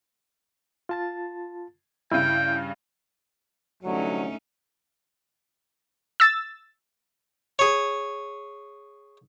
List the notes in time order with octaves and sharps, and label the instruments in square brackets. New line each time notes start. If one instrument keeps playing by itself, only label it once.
[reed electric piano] F4 A5 A6
[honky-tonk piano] G2 C#3 [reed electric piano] E4 [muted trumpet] G5
[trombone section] C2 D3 F#3 [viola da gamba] A3 C#4 D#4
[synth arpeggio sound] E6 A6
[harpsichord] G#4 C#5